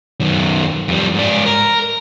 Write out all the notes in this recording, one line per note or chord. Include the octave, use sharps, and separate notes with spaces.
F#2 D#3
F2 G3
G#2 D5
A#4